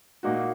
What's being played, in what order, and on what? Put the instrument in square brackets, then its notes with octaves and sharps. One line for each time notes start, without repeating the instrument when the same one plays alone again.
[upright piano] A#2 A#3 D#4 F#4